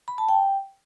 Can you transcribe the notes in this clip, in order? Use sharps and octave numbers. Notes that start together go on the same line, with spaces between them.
B5
A5
G5